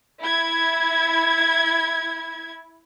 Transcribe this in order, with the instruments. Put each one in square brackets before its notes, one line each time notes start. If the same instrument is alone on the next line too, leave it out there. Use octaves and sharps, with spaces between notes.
[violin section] E4 G#6